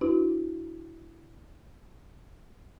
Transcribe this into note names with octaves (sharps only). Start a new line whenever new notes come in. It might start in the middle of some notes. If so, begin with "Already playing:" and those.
D4 E4 F#4 B4